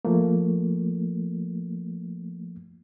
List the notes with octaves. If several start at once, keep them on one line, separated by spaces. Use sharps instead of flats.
F3 A3 A#3